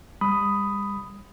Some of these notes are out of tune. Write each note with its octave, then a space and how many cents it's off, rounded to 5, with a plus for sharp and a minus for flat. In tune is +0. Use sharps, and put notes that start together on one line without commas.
G3 +40 B5 +10 D#6 +0